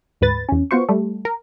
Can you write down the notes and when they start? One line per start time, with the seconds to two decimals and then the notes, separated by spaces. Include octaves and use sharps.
0.21 D2 G#2 B4 A6
0.49 E2 C#4
0.71 B3 F4 F#4 C5 C#6
0.89 G3 A3
1.25 A#4